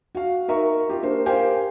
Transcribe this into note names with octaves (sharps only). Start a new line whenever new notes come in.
F#4 F5
D#4 A#4 E5 A#5 C#6
F4 G4
A#3 D4 C5
G4 A#4 C5 F5 G5 G#5